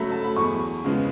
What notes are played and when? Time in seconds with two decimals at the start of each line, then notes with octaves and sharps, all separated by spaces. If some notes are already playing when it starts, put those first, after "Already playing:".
Already playing: C#3 F#3 A3 B5
0.11 A5
0.24 B5
0.36 E2 C#6
0.84 C#3 G#3 B3